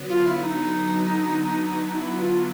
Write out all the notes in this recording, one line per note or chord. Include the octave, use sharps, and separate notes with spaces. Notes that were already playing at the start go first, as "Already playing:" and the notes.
Already playing: D3 F#3 B3
F4
E4
D#4
E4
F4